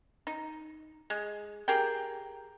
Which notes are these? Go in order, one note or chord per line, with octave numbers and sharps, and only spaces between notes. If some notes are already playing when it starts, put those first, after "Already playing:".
D#4
G#3
G4 G#4 A#4 G5